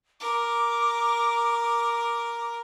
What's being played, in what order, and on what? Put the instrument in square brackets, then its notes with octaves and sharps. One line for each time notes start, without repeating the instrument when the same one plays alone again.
[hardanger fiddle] A#4 [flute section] D6